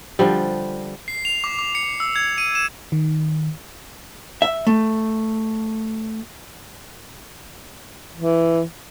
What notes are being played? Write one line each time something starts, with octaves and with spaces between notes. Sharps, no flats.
D3 F3 G3
C7
F7
D6
D6
C#7
E6
G#6
D#7
E7
D#3
E5
A3
E3